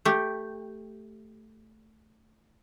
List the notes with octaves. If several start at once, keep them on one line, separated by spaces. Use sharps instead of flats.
A3 G4